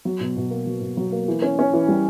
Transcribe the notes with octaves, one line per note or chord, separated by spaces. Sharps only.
F#3
B2
B2
A#3
F#3
B2
F#3
A#3
E3
C#4
C#4
E3
G3